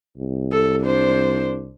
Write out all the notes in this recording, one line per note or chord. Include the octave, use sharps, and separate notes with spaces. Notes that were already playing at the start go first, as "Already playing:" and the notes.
C2
A4
D4 C5